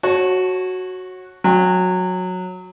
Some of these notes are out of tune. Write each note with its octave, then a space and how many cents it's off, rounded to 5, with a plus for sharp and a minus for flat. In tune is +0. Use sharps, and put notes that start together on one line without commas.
F#4 +0 C#5 -25 A5 +0
F#3 -15 G5 +35